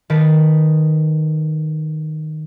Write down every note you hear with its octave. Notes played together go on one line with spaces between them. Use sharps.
D#3 D#4 B4 A5 D7